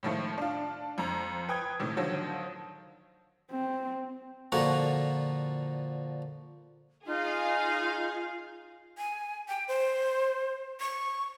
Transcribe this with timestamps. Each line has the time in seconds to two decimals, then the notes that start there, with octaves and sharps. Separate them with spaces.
0.03 A2 D#3 F3 A3
0.38 D4 F4
0.98 F2 A#5
1.49 B4 G5 D#6 G#6
1.80 A2 C3 D#3
1.97 D3 D#3 F3 F#3
3.50 C4
4.52 A#2 D3 F3 F#4 F#5 A#5
7.06 D#4 F4 G#4 F5
8.98 G#5
9.48 G5
9.68 C5
10.80 C#6